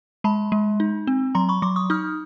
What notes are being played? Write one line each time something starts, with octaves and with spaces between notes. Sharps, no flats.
G#3 A5 B5
G#3
D#4
C4
F#3 A#5 C6
B5 C#6
F#3 C6 D6
C#6 D#6
D#4 D#6 F6